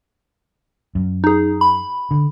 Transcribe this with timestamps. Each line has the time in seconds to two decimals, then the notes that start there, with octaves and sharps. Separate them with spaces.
0.95 F#2
1.24 D#4 G#4
1.61 B5
2.11 D3